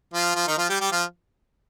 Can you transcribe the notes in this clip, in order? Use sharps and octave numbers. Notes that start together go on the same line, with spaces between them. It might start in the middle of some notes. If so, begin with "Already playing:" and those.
F3 F4
F3 F4
D#3 D#4
F3 F4
G3 G4
G3 G4
F3 F4